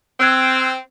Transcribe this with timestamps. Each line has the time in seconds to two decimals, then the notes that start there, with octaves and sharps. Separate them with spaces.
0.20 C4 E6 F#6 G#6